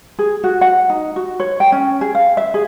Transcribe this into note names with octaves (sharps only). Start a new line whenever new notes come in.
G#4
F#4
F#5
D#4
F#4
C#5
G5
C#4
G#4
F5
E5
G#4